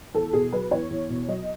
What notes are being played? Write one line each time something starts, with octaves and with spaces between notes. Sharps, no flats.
E2 A4
B2 G#4
F#3 B4
E2 C#5
E2
B2
F#3 D#5